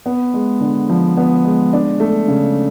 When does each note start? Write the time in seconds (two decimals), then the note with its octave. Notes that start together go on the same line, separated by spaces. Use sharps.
0.06 B3
0.34 G#3
0.61 D3
0.89 F3
1.17 B3
1.45 G#3
1.73 D4
2.00 A3
2.28 C#3